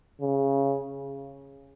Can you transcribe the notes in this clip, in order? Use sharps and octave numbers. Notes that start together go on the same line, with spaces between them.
C#3